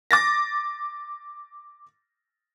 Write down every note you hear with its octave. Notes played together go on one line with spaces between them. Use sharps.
D6 A6 A#6